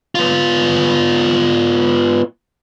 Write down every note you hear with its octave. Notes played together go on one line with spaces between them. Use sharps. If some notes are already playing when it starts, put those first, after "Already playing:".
B3 F4